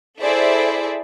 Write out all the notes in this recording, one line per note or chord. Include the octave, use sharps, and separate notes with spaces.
E4 G#4 A4 C5 D5 E5